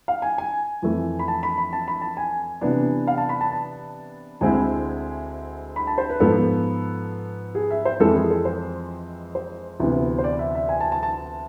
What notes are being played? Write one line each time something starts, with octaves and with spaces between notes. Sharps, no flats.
F5
G#5
G#5
F2 E3 A3
B5
A5
B5
B5
A5
B5
A5
G#5
C3 E3 B3 D4
F5
A5
B5
A5
A5
D2 D3 G#3 C4 E4 G#5
B5
A5
C5
B4
G#2 F3 B3 A4
G#4
E5
C5
F2 E3 G#3 C4 E4 A4
G#4
A4
C5
C5
D2 C3 E3 B3 E4
C5
D5
E5
E5
G#5
A5
A5
A5